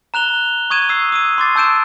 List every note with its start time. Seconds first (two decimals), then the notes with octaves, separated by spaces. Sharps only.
0.14 A#5 F#6 F7 G7
0.70 C#6 D#6 G#6 D#7 E7
0.89 D#6 E6 C7
1.12 D#6 E6 D#7
1.38 C6 D6 A6 C7
1.56 A5 E6 G6 D7 E7